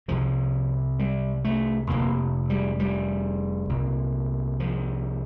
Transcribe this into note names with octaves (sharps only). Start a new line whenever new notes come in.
C2 C3 F3
G3
A3
F1 F2 C3 A#3
G3
G3
C2 A#2
F3